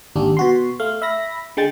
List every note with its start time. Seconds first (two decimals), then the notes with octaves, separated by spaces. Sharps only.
0.16 G#1 D#2 G3 D4
0.37 B2 F#4 C6
0.80 A3 F5
1.02 E5 B5 A#6
1.57 D3 G#3 G5 A6